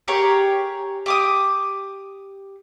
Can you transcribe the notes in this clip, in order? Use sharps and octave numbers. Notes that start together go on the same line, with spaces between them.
G4 G#4 A#4 C#5
G4 D6 D#6